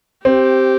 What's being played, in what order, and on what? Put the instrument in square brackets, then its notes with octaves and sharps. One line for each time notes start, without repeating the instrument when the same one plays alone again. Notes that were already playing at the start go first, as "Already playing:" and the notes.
[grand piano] C4 [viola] G4